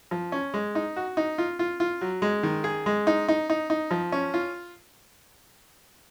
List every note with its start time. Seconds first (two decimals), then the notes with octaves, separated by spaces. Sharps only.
0.11 F3
0.32 C#4
0.54 G#3
0.75 D#4
0.96 F#4
1.17 D#4
1.38 F4
1.59 F4
1.80 F4
2.01 F#3
2.22 G#3
2.43 D#3
2.64 G#4
2.86 G#3
3.07 D#4
3.28 D#4
3.50 D#4
3.70 D#4
3.91 F3
4.12 C#4
4.34 F4